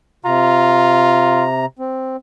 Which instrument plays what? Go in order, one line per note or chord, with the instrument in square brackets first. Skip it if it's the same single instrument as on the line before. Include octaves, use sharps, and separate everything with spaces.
[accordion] C3 A#5 [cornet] F4
[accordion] C4